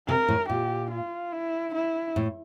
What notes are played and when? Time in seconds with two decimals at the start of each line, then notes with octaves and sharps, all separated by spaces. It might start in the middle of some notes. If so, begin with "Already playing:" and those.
0.08 C3 A#4
0.28 A2
0.49 A#2 G4
0.91 F4
1.32 E4
1.75 E4
2.16 A2